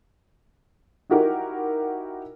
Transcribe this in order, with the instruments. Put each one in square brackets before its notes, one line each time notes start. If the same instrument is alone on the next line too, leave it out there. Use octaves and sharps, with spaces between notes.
[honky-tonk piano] D#4 E4 F#4 G4 A#4